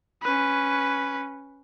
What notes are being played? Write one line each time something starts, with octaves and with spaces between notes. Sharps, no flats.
C#4 B4